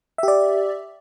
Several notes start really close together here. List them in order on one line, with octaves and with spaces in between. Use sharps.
E5 G4 D5